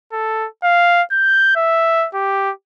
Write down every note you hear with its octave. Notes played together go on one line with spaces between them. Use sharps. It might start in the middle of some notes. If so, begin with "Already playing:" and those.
A4
F5
G6
E5
G4